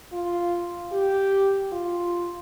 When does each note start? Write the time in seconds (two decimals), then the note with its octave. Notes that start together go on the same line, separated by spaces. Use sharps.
0.12 F4
0.92 G4
1.72 F4